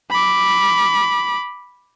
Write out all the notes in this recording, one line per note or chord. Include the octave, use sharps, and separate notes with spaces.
B5 D6